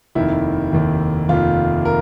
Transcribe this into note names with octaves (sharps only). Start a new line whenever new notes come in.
F1 D#2 D#3 E4
F1 D#2 D#3
F1 D#2 D#3 F4
A#4